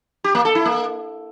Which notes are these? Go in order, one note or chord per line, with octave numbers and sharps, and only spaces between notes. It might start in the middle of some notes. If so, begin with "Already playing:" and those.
G4
A#3
A4
E4
A#3